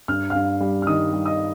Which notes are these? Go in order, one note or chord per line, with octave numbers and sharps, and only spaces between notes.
G2 F6
G2 F5 F6
G3
F6
D#3 D#5 D#6
G3
D#5 D#6